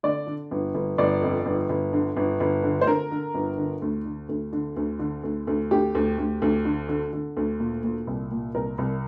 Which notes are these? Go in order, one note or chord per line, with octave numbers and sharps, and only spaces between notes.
D3 D5
D3
G1
G1
G1 D5
F2
G1
G1
D3
G1
G1
D3
C5
D3 A#4
D3
G1
D3
D2
D3
D2
D3
D2
D3
D2
D2
D2 G4
D2
D2
D2
D3
D3
D3
D2
A#2
A#2
C2
A#2
C2 A#4
C2